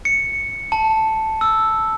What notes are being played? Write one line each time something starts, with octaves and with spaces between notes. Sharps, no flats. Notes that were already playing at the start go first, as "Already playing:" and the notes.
C#7
A5
E6